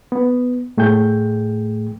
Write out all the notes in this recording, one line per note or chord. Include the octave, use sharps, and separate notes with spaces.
B3
A2 A3 G#4 G5 G6